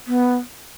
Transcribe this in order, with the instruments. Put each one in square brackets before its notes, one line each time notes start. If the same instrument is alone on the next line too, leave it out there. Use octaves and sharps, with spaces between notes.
[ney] B3